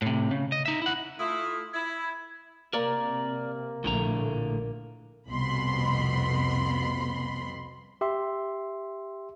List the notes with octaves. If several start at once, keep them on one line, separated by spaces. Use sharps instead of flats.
A2 C3
C#3
D#5
D#4 E5
E4 F#5
A3 E4 F4 D#6
E4 G#6
C3 A#3 A#4 D5
A#1 A2 D3 A3 A#5
A#2
C2 F2 B2 B5 C6
G4 E5 C6